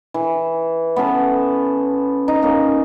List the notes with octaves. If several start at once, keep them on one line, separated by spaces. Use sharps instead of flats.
E3
B3 C#4 A4
D#4
A#3 C#4